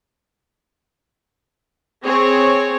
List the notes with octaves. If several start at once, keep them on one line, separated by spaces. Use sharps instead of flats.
C4 G#4 C#5